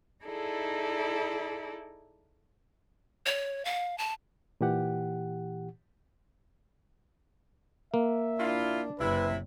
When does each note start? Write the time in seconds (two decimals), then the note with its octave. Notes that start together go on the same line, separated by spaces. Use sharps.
0.23 D#4 E4 G#4 A4 D5
3.26 C#5
3.65 F5
3.98 A5
4.61 A#2 E3 G4 F#5
7.94 A#3 E5
8.39 D4 E4 F4
9.00 F#1 C3 E4 B4